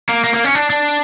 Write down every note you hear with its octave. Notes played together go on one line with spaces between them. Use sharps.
A#3
A#3
A#3
C#4
D4
D4